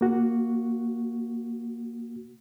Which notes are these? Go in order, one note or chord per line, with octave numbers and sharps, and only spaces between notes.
A#3 F#4